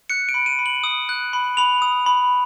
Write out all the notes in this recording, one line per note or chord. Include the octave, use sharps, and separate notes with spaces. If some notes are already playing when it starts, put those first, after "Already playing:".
F#6 C#7
D7
B5
D#7
B5
F#7
D#6
F#6
B5
B5 F7
D#6
B5